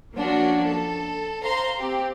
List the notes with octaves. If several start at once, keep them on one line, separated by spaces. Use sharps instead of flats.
F3 A#3 C#4 D4 F#4
A4
C5 F5 A#5 C6
C4 G4